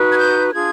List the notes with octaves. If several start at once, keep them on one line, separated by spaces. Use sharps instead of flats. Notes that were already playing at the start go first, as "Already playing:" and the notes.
Already playing: D#4 F#4 B4
G#6
G6
D4 F4 G#4 G#6